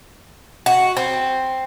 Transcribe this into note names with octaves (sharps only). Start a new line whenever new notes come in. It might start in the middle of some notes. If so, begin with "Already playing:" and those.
F#4
C4